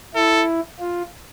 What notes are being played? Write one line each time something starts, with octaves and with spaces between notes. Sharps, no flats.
E4 A4
F4